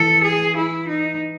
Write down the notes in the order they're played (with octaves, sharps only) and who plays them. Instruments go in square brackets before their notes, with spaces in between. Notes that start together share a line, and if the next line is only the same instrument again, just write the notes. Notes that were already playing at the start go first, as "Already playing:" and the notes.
Already playing: [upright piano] E3 [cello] A4
[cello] G#4
E4
D#4